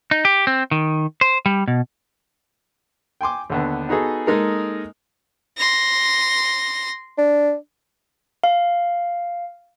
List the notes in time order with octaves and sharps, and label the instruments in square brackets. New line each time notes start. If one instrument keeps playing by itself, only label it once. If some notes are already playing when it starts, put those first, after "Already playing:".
[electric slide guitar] D#4
G4
C4
D#3
C5
G3
B2
[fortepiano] G5 G#5 C6 D6
D#2 D3 B3
B3 D#4 F#4 G#4 A4
G#3 A#3 D#4 A4 A#4
[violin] C6 A#6
[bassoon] D4
[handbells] F5